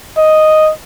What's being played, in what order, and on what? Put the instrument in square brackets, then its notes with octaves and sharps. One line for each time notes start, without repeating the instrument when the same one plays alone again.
[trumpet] D#5